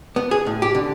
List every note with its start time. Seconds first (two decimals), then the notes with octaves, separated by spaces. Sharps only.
0.16 B3
0.31 G#4
0.47 A2
0.62 G4
0.75 D3